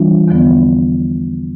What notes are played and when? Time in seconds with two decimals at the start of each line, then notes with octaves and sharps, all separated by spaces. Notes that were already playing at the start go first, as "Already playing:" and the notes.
Already playing: E3 G3 D4 F4
0.28 E2 D3 F3 B3